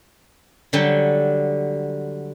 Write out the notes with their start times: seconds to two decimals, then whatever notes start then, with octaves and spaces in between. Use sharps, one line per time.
0.73 D3 F#3 G3